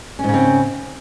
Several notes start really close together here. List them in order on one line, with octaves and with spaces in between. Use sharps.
C#4 G#2 C#3 C4